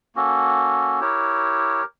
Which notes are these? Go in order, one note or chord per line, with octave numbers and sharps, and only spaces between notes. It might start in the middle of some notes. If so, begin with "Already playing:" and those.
A#3 C#4 F#4 A4
E4 G4 A#4 C#5